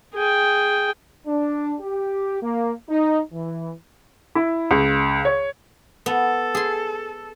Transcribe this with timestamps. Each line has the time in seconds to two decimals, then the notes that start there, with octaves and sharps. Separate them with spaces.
0.14 G#4 G5
1.27 D4
1.80 G4
2.42 A#3
2.90 D#4
3.33 E3
4.35 E4
4.71 C#2
5.25 C#5
6.06 B3 A4
6.55 G#4 C6